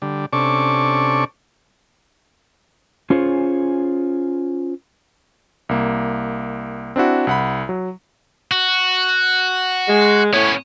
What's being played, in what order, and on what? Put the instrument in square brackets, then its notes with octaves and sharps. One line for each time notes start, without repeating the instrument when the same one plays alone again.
[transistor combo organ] D3 G3
C3 C#4 D4 A4 D5 C#6
[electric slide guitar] C#4 F4 G#4 C5 C#5
[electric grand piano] C2 A#3
C4 D4 E4 F#4
C2 F#5 B5
F#3
[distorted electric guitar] F#4
[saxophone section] G#3
[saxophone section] A2 C#5 [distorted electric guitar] B3 C#4